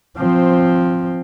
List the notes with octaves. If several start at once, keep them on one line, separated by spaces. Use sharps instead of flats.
F3 C4